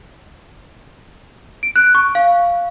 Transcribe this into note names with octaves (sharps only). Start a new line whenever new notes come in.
D7
F#6
C#6
F5